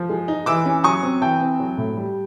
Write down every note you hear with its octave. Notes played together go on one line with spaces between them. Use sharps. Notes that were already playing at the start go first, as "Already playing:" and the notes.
Already playing: F3
G#3
D#4
E3 D6 E6
C#4
F#3 C#6 D#6
C4
E3 G5 A5
C4
F#3
A2
G3